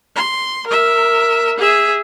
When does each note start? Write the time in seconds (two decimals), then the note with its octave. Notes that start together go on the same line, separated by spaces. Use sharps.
0.15 C6
0.67 A#4 E5
1.58 G#4 E5